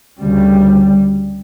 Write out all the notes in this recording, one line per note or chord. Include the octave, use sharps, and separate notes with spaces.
D2 C#3 G3